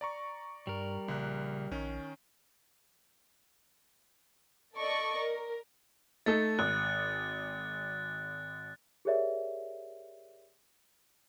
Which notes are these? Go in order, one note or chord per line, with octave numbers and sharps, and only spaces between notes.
D5 A#5 C#6
G2 G3 A#4
A#1 C#3 F#6
A#1 D#3 C#4
A4 D5 D#5 C#6
A#4
A3 D#4 A4 A6
G#1 F#6
G4 G#4 A#4 C#5 D5 E5